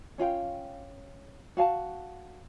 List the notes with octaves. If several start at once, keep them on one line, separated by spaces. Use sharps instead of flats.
C#4 F4 F5 G5
F#4 F5 G#5 A5